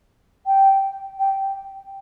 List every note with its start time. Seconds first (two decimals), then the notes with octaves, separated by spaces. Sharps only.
0.47 G5
1.19 G5